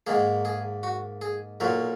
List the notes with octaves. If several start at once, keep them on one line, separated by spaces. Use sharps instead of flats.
G#2 D#3 A#3 G#4
G#4
F#4
G#4
B1 A#2 F#3 A#4